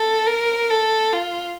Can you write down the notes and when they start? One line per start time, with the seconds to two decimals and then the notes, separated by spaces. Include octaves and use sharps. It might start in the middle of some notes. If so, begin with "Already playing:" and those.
Already playing: A4
0.26 A#4
0.70 A4
1.13 F4